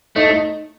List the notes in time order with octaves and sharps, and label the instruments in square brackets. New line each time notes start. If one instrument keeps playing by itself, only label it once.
[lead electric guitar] A3 [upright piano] D#4
[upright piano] D#4